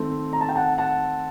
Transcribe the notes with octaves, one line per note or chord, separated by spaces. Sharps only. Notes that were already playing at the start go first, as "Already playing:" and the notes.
Already playing: D#3 A3 C4
A#5
A5
G5
F#5 A5
F#5 A5